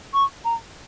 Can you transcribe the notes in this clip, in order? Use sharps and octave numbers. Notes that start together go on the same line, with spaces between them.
C#6
A#5